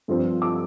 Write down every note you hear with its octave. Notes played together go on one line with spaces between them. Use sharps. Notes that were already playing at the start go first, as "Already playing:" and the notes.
G2 F3 C4
D6